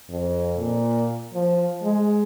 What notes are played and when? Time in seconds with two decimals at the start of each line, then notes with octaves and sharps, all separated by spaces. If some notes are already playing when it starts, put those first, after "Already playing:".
0.10 F2
0.59 A#2
1.34 F3
1.84 G#3